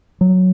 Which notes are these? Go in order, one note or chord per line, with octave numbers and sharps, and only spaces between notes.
F#3